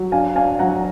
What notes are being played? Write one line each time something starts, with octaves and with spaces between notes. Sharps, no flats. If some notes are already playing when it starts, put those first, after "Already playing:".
Already playing: F#3
D4 F5 G#5
D4 F5 G#5
F#3 F#5 A#5